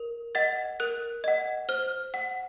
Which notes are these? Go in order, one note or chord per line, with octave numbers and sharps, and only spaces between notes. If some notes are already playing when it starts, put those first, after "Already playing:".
Already playing: A#4
D#5 F#5 A6
A#4 F#6
D#5 F#5
C5 F6
F#5